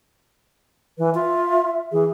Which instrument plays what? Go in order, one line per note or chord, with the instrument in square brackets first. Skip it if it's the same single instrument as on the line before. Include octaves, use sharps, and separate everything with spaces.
[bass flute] E3 [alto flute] B4
[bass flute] F4 [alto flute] E5
[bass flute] E3 [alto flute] G#4